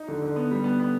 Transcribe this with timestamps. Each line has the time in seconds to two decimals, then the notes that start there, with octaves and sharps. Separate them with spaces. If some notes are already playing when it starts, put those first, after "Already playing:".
Already playing: D#4
0.08 D3
0.22 D3
0.36 B3
0.51 G3
0.64 B3
0.80 B3